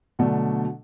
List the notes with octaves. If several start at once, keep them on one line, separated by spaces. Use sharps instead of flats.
B2 D3 F#3 A3 D4